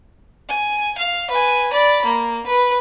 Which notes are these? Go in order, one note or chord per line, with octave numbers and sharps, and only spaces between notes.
G#5
F5
B4 G#5
D5 B5
A#3
B4